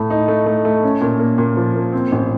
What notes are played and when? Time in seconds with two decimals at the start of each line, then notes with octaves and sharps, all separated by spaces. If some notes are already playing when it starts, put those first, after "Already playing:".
Already playing: A2 A3
0.10 D#4
0.28 A3
0.46 A3
0.65 A3
0.83 C#4
1.01 A#2
1.19 A#3
1.38 A#2
1.57 F3
1.75 A#3
1.92 C4
2.12 A1